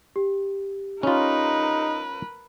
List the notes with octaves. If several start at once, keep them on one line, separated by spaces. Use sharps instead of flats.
G4
C#4 D#4 F4 A#4 B4